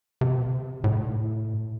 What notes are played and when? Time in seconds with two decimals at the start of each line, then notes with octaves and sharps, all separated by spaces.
0.21 C3
0.84 A2